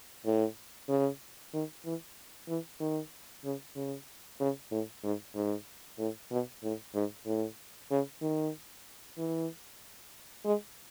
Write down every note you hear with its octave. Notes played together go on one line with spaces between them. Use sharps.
A2
C#3
D#3
E3
E3
D#3
C#3
C#3
C#3
A2
G#2
G#2
A2
B2
A2
G#2
A2
C#3
D#3
E3
G#3